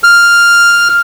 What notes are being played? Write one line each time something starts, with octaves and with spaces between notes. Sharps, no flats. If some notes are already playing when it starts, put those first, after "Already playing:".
F6